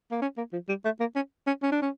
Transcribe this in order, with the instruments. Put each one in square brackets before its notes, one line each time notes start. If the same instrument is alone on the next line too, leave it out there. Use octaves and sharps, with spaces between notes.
[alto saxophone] A#3
C#4
A#3
F3
G3
A3
A#3
C#4
C#4
C#4
D4
C#4